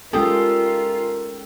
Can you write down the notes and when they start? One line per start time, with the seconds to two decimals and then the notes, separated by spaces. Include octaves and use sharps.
0.13 G#3 C#4 F4 G4 A4 A#4 G5 D#6